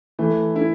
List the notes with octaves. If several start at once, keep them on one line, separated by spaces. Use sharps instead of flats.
E3 A3
E4